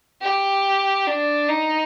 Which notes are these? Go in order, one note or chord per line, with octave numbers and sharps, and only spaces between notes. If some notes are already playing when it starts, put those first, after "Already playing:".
G4
D4
D#4